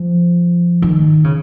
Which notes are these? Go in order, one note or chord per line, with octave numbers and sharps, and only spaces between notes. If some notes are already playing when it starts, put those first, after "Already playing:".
Already playing: F3
D#3
C#3